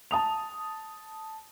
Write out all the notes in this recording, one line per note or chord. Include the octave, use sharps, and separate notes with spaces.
A5 D#6 F7